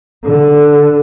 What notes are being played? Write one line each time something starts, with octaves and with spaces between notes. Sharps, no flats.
D3